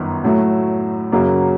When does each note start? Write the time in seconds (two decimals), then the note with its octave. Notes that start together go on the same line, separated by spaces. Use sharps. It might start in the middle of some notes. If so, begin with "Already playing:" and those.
Already playing: G1 F#2 D#3 B3
0.24 A2 F#3 A3
1.12 F#2 C#3 F#3 A#3